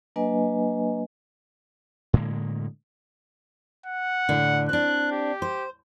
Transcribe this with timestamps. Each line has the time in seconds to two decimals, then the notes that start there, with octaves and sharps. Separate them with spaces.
0.16 F#3 A#3 D4 B4 D#5 G#5
2.13 A2 D3 G#3 A#3
3.86 F#5
4.29 A2 D3
4.69 C4 D4 F#6
5.12 G4
5.42 C5